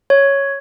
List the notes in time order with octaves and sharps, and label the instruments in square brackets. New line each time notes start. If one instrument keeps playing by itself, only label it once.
[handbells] C#5